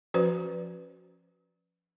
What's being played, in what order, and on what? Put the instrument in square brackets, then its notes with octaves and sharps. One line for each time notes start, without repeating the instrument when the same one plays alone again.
[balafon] F3 C#4 F#4 B4 C5